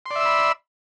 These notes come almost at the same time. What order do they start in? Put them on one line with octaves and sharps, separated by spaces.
C6 D5 E5 E6 B5